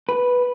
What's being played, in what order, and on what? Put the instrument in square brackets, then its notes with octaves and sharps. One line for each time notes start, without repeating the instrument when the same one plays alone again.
[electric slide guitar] B4